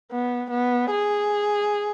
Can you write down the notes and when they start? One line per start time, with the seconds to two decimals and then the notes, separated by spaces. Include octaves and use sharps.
0.11 B3
0.51 B3
0.91 G#4